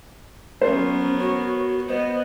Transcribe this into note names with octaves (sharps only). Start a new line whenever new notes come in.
F#3 B3 C#4 A#4 C5
F#4 C#5
B3 C5 D#5